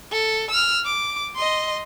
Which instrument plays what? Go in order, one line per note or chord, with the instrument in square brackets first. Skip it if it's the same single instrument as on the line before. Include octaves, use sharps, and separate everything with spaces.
[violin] A4
E6 F6
D6
D#5 C6